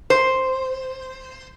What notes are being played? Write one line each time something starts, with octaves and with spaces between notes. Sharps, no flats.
C5